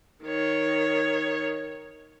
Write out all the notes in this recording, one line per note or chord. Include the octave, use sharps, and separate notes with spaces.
D#3 C#5